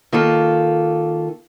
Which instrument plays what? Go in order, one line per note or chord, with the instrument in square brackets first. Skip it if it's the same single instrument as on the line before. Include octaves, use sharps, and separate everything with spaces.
[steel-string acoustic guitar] D#3 A#3 F4 A4